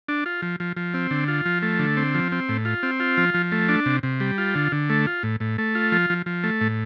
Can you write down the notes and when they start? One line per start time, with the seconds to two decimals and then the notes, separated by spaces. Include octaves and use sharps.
0.08 D4
0.26 F4
0.42 F3
0.60 F3
0.77 F3
0.94 C4
1.11 D3
1.28 F4
1.46 F3
1.62 A3
1.79 D3
1.97 C4
2.15 F3
2.32 C4
2.49 A2
2.65 F4
2.83 C4
3.00 F4
3.17 F3
3.34 F3
3.52 A3
3.69 D4
3.86 C3
4.03 C3
4.20 G3
4.38 F4
4.55 D3
4.72 D3
4.89 A3
5.07 F4
5.23 A2
5.40 A2
5.58 A3
5.75 F4
5.92 F3
6.10 F3
6.26 F3
6.44 A3
6.61 A2